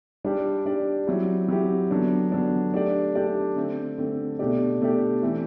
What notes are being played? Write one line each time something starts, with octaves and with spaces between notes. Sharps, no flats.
G3 D4 G4 D5
G3 D4 G4 D5
F#3 C4 E4 G4
F#3 C4 E4 G4
D3 F#3 B3 D4
D3 F#3 B3 D4
A3 D4 G4 D5
A3 D4 G4 D5
D3 A3 C4
D3 A3 C4
B2 A3 D4 G4 D5
B2 A3 D4 G4 D5
E3 A3 C4